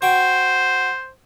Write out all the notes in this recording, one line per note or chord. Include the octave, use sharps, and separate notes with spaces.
F#4 C5 G5